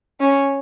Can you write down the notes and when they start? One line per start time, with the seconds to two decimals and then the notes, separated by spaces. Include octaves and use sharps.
0.20 C#4